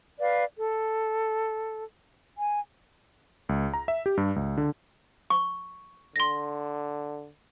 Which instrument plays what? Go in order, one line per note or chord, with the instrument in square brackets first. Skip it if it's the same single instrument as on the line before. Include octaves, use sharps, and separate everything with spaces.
[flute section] B4 D5 F5
A4
G#5
[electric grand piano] C#2
A#5
E5
G4
G2
C#2
D3
[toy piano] C#6
[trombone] D3 [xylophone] C6 A#6